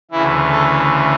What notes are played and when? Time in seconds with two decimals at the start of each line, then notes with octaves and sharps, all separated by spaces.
0.11 D2 C#3 E3 E4
0.51 A4